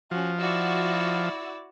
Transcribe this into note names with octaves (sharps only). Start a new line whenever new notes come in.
F3 C#4 F#4
E4 F#4 D5 E6